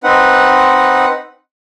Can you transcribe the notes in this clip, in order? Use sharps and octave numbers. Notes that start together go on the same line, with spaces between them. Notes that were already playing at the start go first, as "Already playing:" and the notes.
C4 D#4 B4 F#5